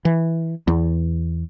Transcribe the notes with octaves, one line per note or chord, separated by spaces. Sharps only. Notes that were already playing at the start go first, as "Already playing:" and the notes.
E3
E2